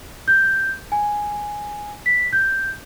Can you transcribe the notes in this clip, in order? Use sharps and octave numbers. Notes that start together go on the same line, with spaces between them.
G6
G#5
B6
G6